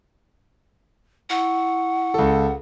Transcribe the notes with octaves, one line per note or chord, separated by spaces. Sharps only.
E4 F#5 C#6
C#2 A4